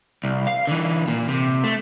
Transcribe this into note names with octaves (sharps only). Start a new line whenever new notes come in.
C2
F5
D3 E3
A#2
C3
A3